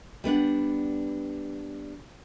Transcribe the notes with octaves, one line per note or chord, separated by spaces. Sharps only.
G3 B3 D4 F#5